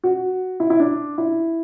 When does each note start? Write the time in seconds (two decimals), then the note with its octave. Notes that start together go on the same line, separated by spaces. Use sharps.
0.04 F#4
0.60 E4
0.70 E4
0.80 D4
1.18 E4